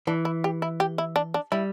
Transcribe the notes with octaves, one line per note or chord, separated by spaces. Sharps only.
E3 D4
E4
G4
E4
G4
E4
D4
D4
G3 E4